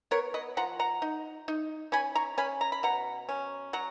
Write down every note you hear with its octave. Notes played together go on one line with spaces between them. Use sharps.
B3 A#4 C#5
B4 D#5
F3 F#5 A#5
F#5 A#5
D#4
D#4
C#4 G#5 B5
A#5 C#6
C#4 G#5 B5
A#5
B5
B2 F#5 A#5
C#4
F#3 F#5 A#5